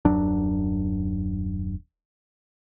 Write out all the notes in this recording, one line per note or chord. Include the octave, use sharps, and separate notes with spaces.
D#1 F#2 F#3 D4